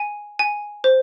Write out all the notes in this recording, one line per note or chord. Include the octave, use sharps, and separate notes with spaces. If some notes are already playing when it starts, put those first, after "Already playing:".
Already playing: G#5
G#5
C5